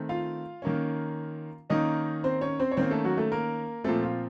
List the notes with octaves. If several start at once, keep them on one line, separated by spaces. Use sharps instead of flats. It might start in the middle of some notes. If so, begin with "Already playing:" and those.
Already playing: D#3 A3 C4
F4 F5
D#3 A#3 C#4
D#3 A#3 C#4 D#4 D#5
C4 C5
C#4 C#5
C4 C5
C#5
D#3 A#3 C4 C#4 C5
A3 A4
F#3 F#4
A3 A4
A#3 A#4
A#2 F3 A3 C4 A4
F4